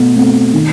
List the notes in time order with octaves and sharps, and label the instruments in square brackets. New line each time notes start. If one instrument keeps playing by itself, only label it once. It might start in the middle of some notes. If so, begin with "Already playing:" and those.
Already playing: [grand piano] B2 A3
A3 C4
D#3